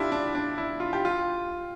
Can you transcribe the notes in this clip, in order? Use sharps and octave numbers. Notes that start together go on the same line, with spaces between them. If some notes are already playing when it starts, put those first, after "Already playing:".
Already playing: D4 E4 F4 G4
D4
D4
E4
F4
G4
F4